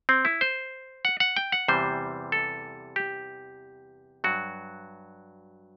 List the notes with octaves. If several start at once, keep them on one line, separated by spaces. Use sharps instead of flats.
C4
E4
C5
F#5
F#5
G5
F#5
E2 C3 E3 G3 C5
A4
G4
G2 F#3 F#4